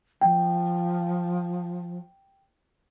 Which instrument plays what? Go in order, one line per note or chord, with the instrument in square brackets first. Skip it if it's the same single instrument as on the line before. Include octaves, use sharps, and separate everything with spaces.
[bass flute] F3 [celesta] G5